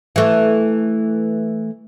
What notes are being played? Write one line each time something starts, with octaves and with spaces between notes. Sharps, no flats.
E3 A3